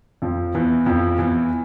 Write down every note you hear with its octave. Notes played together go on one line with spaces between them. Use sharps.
F2 F3
E2 E3
F2 F3
E2 E3